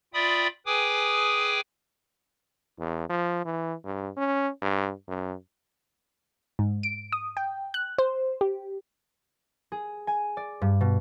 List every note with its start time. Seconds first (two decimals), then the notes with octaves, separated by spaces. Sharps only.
0.14 F4 D5 E5 G5 B5 D#6
0.66 G#4 B4 G5 G#5 D6 D#6
2.79 E2
3.09 F3
3.45 E3
3.85 G2
4.17 C#4
4.62 G2
5.08 F#2
6.59 G#2
6.83 D7
7.12 D#6
7.37 G5
7.74 F#6
7.98 C5
8.41 G4
9.72 G#4
10.07 G#5
10.37 D5
10.61 G2
10.81 B2